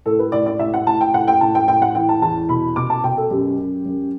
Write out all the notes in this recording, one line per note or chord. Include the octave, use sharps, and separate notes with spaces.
A2 A4
B4
A2 D5
D5
A2 E5
F#5
A2 A5
G5
A2 F#5
G5
A2 A5
G5
A2 G5
F#5
E3 G5
A5
E2 A5
B2 B5
B2 D6
A5
B2 G5
A4
F#2 G4
F#2
F#2